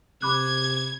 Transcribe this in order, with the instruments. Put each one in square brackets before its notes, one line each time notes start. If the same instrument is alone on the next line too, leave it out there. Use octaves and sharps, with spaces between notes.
[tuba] C3 [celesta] B5 D6 F#6 [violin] G#6